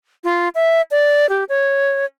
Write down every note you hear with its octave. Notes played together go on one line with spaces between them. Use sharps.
F4
E5
D5
G4
C#5